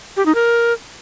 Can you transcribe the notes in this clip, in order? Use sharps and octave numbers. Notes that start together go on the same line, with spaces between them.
G4
D#4
A#4